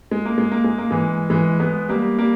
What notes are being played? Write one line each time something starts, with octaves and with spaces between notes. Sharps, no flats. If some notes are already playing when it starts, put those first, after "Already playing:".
G#3
A#3
G#3
A#3
G#3
A#3
E3 G#3
E3 G#3
G#3 B3
G3 A#3
G3 A#3